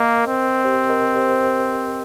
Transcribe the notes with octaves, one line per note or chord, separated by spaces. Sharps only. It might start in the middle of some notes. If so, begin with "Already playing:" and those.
Already playing: A#3 A#4 D#5
C4
G4 C5
A#4 D#5
G4 C5